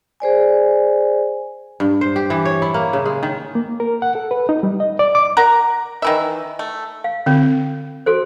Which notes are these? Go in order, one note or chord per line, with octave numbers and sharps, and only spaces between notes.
G#4 C5 D5 G#5
G2
C5
G4
E3
C#5
E4
A#3
C#3
G#3
D#3
A#3
A#4
F#5
A4
B4
D#4
G3
D#5
D5
D6
A#4 F#5 A#5
D#3 E3 E5
A3
F5
D3 C4
F#4 A4 C5